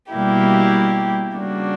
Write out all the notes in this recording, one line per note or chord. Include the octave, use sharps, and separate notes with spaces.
B2 G3 A#3 E4 G4
C#3 G3 A#3 D4 F#4